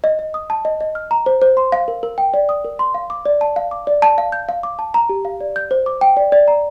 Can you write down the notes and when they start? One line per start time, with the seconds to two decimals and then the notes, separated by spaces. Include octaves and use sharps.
0.04 D#5
0.19 D#5
0.34 D#6
0.50 A5
0.65 D#5
0.81 D#5
0.95 F6
1.11 A#5
1.26 C5
1.42 C5
1.57 C6
1.72 F5
1.88 A#4
2.03 A#4
2.18 G5
2.34 D5
2.49 D#6
2.65 A#4
2.79 C6
2.94 F5
3.10 D6
3.26 D5
3.41 A5
3.56 F5
3.71 D6
3.87 D5
4.02 A5
4.18 F5
4.32 G6
4.49 F5
4.63 D6
4.79 A5
4.94 A#5
5.09 G4
5.25 F5
5.41 D5
5.56 G6
5.71 C5
5.86 D6
6.01 G5
6.17 D5
6.32 D5
6.48 A#5